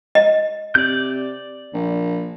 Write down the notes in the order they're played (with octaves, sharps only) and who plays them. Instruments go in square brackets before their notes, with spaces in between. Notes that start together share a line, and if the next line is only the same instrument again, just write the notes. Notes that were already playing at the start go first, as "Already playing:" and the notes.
[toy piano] D#5
[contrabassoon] C3 [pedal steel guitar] D5 G6
[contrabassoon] A#1